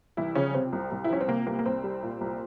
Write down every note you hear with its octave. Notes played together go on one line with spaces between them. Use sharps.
C2 E3 E4
C#3 F3 C#4
C3 C4
C2
C2
E4
F3 C#4
C4
C3 A#3
C2 A#3
A#3
C2 C4
G3
A#2
C2